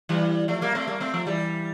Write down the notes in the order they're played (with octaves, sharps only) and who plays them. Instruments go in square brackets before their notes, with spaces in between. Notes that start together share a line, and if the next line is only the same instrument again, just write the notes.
[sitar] E3 G3
F3 A3
G3 A#3
A3 C4
G3 A#3
A3 C4
F3 A3
E3 G3